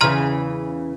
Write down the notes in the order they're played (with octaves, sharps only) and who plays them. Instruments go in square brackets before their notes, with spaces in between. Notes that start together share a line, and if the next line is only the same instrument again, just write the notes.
[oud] E2 C#3 E3 [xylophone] A#5 C6 F6